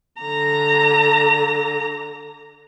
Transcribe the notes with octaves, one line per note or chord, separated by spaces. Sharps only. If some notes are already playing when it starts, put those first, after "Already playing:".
D3 A#5